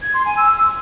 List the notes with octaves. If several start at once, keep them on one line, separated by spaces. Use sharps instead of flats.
G#6
C6
G#5
E6